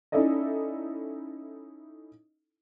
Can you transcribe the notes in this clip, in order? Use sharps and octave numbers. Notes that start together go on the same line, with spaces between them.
C#4 D#4 E4 A4 D5 D#5